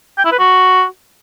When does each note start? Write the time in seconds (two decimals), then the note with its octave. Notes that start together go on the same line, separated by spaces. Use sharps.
0.18 G5
0.25 E4
0.32 B4
0.39 F#4